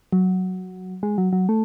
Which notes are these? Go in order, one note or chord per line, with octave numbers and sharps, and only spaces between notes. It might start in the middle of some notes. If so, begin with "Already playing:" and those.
F#3
G#3
F#3
F#3
A3